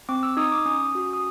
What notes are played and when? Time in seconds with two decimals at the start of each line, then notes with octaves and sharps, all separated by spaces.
0.09 C4 D6
0.23 E6
0.37 D#4 D#6
0.52 D6
0.65 C#4 D#6
0.95 F#4
1.13 D#6